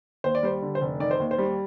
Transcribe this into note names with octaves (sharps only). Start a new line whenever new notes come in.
D#2 C5
D5
G3 C5
D3
C5
F1
D#3 D5
C5
D#2
C5
G3